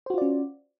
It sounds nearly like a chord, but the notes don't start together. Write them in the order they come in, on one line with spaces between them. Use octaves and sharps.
C5 F#4 F4 D5 C#4